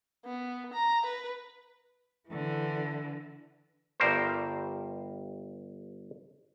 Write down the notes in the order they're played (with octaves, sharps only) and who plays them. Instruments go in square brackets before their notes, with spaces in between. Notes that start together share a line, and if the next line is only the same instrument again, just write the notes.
[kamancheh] B3
A#5
B4
[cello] D3 E3
[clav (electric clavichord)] G1 G2 G3 A#4 C5